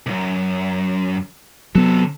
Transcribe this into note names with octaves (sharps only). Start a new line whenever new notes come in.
C2 F#2
C3 F#3 B3 A4